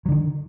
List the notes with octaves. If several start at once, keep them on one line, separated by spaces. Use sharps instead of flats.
D3 D#3 F#3